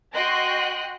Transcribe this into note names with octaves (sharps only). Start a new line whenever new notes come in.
F#4 D#5 G5 C6 F#6 A#6